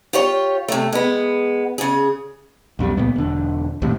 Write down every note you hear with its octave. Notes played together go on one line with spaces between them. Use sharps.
F4 G4 C#5
C3 A3
G#3 B3
C#3 G#4
B1 F2 B2 G3
C#2 A#2 B3
E1 D3
A#1 D#2 A2 C3